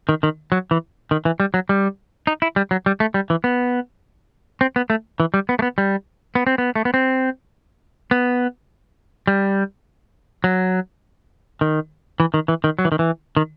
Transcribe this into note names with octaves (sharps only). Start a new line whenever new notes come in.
D#3
D#3
F#3
E3
D#3
E3
G3
F#3
G3
D#4
E4
G3
F#3
G3
A3
G3
E3
B3
C4
B3
A3
E3
G3
B3
A3
B3
G3
B3
C4
B3
A3
B3
C4
B3
G3
F#3
D#3
E3
D#3
E3
D#3
F#3
E3
D#3
E3
D#3